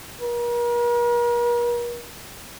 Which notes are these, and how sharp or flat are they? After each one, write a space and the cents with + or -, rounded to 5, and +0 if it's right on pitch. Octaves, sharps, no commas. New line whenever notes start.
A#4 +40